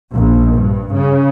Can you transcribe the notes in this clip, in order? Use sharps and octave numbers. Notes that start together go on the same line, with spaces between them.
A#1
G2
C#3